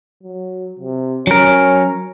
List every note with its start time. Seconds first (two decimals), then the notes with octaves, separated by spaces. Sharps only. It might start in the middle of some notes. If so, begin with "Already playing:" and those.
0.23 F#3
0.79 C3
1.27 F#3 C#4 A#4